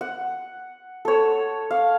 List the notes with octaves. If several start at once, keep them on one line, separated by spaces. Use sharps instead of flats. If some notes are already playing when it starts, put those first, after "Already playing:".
F#5
A4 C#5
F5